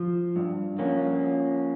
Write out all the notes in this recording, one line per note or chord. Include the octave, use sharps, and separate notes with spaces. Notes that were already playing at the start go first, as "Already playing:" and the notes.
Already playing: F3
G2
F3 A#3 C#4